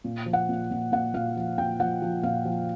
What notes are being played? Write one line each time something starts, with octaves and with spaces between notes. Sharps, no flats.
A#2
F3
F#5
A#2
A#2
A#2 F#5
A#2 F5
F3
A#2 G5
F3 F#5
F3
A#2 F5
F3